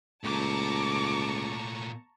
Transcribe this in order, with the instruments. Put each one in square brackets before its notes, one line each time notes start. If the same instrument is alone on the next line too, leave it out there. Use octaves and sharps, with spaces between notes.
[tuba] C#2 [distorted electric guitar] A#2 A3 [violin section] A5 A#5 C#6 [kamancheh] D6